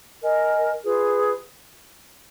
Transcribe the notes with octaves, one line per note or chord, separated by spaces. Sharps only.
A#4 D#5 G#5
F4 G#4 B4